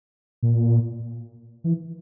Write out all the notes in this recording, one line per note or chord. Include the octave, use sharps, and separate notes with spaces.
A#2
E3